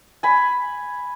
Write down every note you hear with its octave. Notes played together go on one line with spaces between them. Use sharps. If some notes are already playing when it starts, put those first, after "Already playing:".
G#5 B5